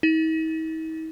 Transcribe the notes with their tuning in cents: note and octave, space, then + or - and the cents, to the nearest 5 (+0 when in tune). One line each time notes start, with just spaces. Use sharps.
D#4 +45